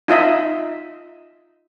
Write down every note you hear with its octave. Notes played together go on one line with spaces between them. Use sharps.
D#4 F4 D#5 E5